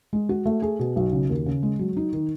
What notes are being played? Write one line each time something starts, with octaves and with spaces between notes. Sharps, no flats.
G#3
F#4
A3
G#4
B2
B1
C#3
D#2
C#3
G#3
F#3
D#4
D#3